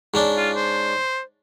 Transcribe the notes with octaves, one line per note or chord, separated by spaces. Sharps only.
G#2 C#4 D4
F4
C5